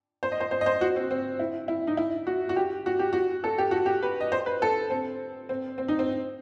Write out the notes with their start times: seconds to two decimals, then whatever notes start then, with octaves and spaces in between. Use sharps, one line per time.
0.23 C5
0.32 D#5
0.40 C5
0.51 C5
0.61 D#5
0.66 C5
0.81 F#4
0.96 C4
1.11 C4
1.39 E4
1.68 E4
1.87 D#4
1.97 E4
2.27 F#4
2.49 F#4
2.56 G4
2.86 F#4
2.99 G4
3.13 F#4
3.44 A4
3.58 G4
3.71 F#4
3.86 G4
4.03 B4
4.20 D#5
4.32 C5
4.46 B4
4.62 A4
4.90 C4
5.49 C4
5.78 C4
5.88 D#4
5.99 C4